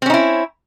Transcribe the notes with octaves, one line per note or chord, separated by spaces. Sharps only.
C4 C#4 D#4 E4